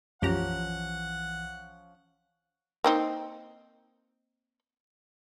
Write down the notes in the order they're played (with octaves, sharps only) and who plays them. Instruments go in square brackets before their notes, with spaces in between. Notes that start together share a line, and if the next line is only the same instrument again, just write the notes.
[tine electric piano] B1 E3 [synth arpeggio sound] F#2 G4 A#5 [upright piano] F3 C#4 [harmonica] F#5
[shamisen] A#3 C4 D#4